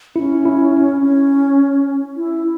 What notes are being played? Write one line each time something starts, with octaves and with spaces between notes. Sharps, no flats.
C#4 E4
E4
C#4
E4